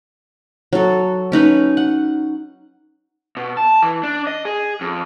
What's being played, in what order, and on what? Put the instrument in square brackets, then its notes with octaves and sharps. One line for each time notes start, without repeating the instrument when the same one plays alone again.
[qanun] F#3 A4
C#4 D#4 B4 C#5
F#5
[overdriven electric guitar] B2
A5
E3
D4
D#5
G#4
F2